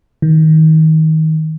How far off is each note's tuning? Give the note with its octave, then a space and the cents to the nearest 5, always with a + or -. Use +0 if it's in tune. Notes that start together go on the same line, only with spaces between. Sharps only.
D#3 +25